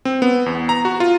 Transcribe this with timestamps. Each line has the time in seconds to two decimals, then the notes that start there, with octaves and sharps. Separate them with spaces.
0.05 C4
0.22 B3
0.46 E2
0.69 A#5
0.85 F#4
1.00 F4